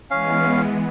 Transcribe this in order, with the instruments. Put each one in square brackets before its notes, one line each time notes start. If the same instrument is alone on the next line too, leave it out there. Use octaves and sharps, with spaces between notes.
[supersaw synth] E3 G#3 B3 [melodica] C#4 F5